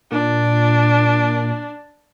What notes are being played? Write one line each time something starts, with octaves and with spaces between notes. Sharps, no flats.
A#2 D4